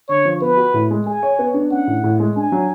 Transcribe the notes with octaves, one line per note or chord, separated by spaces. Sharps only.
D3 C#5
F3
B3 B4
F#4
A2
G#3
G#4 G#5
C#5
B3
D4
C#4 F#5
A2
A2
G#3
D4 G#5
F#3